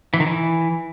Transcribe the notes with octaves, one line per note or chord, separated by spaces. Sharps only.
E3
D#3
E3